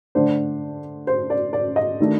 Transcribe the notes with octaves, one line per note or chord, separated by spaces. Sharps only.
D3 A3 D4 C5
C5
D5
D5
D#5
D#3 A3 D4